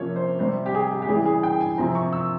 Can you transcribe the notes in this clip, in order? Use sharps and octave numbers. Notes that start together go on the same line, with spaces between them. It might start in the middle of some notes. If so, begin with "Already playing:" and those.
Already playing: C3 F3 A#3 C#4 C#5
C5
C3 G3 C4 C5
G4
G#4
G4
G4
C#3 E3 G3 G#4
G#4
G5
G#5
C3 F3 C4 A#5
C#6
E6